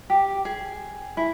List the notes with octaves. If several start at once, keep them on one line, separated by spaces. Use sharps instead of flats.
G4
G#4
E4